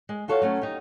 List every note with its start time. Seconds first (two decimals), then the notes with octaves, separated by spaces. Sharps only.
0.09 G#3
0.28 F4 F#4 A4 C#5 F5
0.42 F#3 A3 C#4
0.62 D#4 G4